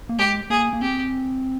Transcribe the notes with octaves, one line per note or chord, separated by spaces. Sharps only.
A#3
G#3 G4
A#3 G#4
A#3
C4 G4